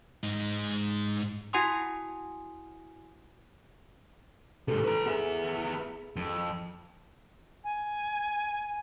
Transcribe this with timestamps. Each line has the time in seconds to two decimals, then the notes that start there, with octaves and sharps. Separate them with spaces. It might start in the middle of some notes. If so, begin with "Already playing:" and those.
0.24 G#2 D#4
1.53 E4 F#4 F#5 G#5 C6 D#6
4.68 G#2 C3 A4
4.85 B4 A#5
5.06 B3 G#4 E5
6.16 F2
7.64 G#5